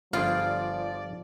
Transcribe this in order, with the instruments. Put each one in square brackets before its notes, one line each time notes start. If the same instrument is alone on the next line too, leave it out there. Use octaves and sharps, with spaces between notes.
[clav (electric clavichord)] G1 G3 G#4 [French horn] F3 [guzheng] F4 [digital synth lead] D5